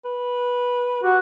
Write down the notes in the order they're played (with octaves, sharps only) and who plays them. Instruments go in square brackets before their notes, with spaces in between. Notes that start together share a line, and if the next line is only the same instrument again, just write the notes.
[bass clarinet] B4
[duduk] F#4 [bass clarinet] G4